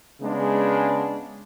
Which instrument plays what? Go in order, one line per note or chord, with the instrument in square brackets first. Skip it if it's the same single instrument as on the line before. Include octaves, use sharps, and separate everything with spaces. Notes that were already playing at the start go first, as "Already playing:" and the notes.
[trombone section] C#3 G#3 B3 D4